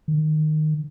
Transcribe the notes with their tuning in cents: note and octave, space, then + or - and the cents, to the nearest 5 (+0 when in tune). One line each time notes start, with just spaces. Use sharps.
D#3 -15